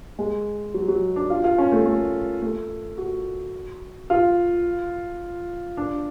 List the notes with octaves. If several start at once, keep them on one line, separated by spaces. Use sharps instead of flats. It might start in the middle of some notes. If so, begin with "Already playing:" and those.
G#3
F#3
F#3
D4
F4
F4
C#4
A3
A3
A3
F#4
F4
D4